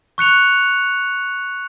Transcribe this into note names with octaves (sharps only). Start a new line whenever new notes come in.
C#6 F#6 C#7 F7